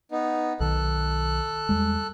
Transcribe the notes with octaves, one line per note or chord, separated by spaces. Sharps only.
B3 D#4
B1 D#3 A4 F#6
E2 G3 G#3